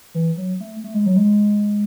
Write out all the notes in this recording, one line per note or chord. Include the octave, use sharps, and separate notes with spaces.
E3
F#3
A3
A3
G#3
F#3
G#3